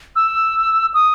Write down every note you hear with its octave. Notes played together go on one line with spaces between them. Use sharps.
E6
D#6